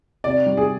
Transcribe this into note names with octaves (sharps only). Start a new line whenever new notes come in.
C3 D5
G3
G#4